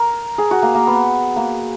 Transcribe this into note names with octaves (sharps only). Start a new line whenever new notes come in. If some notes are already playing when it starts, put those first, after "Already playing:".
Already playing: A#4
G#4
F#4
A#3
A#3
B3
A#3